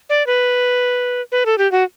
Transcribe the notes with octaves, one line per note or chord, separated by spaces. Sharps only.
D5
B4
B4
A4
G4
F#4